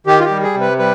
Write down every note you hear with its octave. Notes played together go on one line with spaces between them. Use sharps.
D#3 G4
F4
G4
G3
G#4
C3
B4
G3 B4